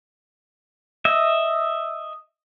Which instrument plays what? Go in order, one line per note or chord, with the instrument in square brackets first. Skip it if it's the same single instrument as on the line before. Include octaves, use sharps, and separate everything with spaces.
[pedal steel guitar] D#5 E5